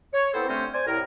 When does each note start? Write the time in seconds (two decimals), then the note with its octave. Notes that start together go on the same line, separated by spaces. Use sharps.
0.14 C#5
0.34 B3 C4 E4 A4 C5
0.48 D3 G3 A3 C4 C#4 C5
0.74 C5 D5 G#5
0.87 C2 A2 A#4